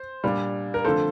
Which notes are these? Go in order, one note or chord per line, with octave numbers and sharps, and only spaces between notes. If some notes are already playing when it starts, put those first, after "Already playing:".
Already playing: C5
A#2 G3 D4
A#4
D3 F3 A3 C4 A4 C5